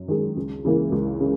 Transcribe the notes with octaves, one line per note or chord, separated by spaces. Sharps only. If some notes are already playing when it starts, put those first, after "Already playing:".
Already playing: F#2
D#3 G#3
C#2
C#3 E3 A#3
C#2
C#3